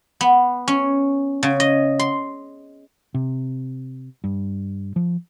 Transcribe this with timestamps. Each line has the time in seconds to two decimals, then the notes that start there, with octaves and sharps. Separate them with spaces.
0.21 B3
0.68 C#4
1.43 C#3
1.60 D#5
1.99 C6
3.14 C3
4.24 G2
4.96 F3